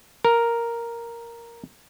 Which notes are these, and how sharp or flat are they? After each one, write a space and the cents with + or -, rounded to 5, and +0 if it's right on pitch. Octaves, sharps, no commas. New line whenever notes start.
A#4 +0